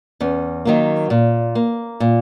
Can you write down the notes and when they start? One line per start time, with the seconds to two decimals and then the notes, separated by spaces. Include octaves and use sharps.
0.20 E2 C#4
0.65 D#3 F#3 A#3
1.10 A#2
1.55 A#3
2.00 A#2